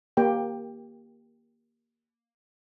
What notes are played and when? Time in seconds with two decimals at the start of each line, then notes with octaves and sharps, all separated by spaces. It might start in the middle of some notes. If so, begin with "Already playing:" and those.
0.17 A#3 G4 G5